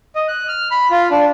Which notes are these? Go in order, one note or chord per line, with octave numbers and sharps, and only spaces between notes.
D#5
F#6
F6
B5
F4
D4